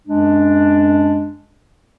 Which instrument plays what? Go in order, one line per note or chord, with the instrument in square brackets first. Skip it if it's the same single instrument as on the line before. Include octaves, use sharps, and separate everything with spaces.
[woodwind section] F#2 G#3 D4